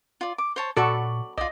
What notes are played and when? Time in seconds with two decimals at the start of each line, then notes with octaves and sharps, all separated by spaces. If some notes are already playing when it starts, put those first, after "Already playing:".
0.21 F4 D5
0.38 D6
0.56 C5 C#5 A5
0.77 A#2 F#4 A4 D5 B5 C#6
1.38 B1 F4 D5 D#5